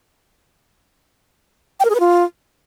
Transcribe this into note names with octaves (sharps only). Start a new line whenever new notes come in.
G5
A#4
G#4
B4
F4